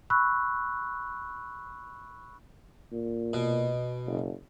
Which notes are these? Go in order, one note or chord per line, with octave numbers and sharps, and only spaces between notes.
B5 C#6 E6 F#6
A#2
B2
F#1